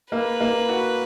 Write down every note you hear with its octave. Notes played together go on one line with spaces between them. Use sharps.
A#3 B4
A#3
F#4